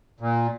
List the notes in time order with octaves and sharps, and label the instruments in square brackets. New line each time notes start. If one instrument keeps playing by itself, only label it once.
[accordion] A#2